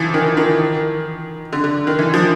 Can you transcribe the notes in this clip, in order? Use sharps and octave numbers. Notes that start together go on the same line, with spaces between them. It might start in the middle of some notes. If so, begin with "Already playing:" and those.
Already playing: E3 F3
D#3
D#3
D3
D3
D#3
E3
F3